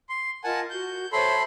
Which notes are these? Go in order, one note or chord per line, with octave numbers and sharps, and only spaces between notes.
C6
F4 A#4 D#5 F#5 G#5 A5
F#4 G6
A4 C5 C#5 E5 B5 C6